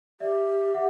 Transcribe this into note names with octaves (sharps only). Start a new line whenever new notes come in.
G4 D5 E5
E5 F#5